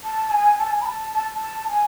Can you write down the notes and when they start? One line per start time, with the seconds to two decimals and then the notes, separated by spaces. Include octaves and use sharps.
0.04 A5
0.31 G#5
0.59 A5
0.70 G#5
0.81 B5
0.86 A5
1.14 A5
1.34 A5
1.69 G#5